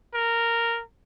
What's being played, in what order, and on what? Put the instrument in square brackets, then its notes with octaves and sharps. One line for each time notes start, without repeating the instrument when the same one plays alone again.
[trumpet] A#4